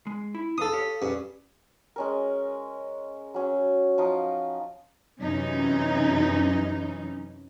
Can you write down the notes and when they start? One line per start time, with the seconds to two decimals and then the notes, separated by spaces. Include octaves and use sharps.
0.07 G#3
0.35 E4
0.58 D4 A4 B4 F5 D#6
0.73 G4 C#5 F5
1.02 G2 C#4 B4
1.96 G#3 C#4 A#4
3.34 F#3 C#4
3.98 F3 D#4 F4
5.20 F#2 C3 E3 C#4 D#4